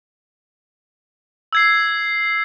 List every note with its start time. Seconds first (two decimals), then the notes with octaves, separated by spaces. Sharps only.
1.53 E6 G#6 C7